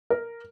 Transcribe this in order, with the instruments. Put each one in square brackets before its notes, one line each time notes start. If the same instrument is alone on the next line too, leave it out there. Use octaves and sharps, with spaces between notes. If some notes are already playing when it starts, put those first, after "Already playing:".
[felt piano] A#4